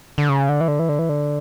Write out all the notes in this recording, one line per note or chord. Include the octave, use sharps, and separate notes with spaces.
D3
C#3
D3
E3
D3
E3
D3
E3
D3